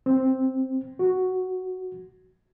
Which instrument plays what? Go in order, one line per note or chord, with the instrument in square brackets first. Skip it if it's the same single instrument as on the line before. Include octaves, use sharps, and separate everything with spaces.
[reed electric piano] C4
F#4